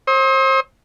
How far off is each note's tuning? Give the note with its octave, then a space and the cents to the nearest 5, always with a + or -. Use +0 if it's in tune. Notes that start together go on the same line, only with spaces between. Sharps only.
C5 +35 D#6 +45